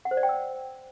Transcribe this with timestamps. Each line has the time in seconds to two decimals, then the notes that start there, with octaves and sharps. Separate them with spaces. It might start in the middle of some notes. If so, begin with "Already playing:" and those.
0.05 F#5
0.11 C5
0.17 D5
0.23 G5
0.29 E6